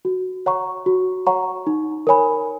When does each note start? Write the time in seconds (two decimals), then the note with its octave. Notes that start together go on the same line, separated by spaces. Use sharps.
0.05 F#4
0.46 C#5 F#5 A#5 C#6
0.86 F#4
1.27 C#5 F#5 A#5 C#6
1.67 D#4
2.07 A#4 C#5 G#5 B5